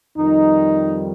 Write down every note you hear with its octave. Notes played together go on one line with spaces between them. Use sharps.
F2 D#3 G3 D#4